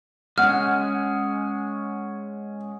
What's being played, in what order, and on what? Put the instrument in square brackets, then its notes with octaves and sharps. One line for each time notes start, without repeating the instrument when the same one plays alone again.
[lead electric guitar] G#3 C#4 [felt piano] F#5 [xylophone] F6